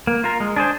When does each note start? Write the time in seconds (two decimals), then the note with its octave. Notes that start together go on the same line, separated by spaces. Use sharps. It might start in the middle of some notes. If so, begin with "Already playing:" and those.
0.07 A#3
0.24 F4 A#4
0.40 G#3
0.56 D4 G#4 C5